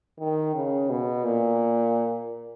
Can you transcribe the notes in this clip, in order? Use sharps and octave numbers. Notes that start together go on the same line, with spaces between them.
D#3
C#3
B2
A#2